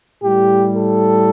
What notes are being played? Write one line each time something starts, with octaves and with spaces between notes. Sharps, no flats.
A2 G3 G4
A4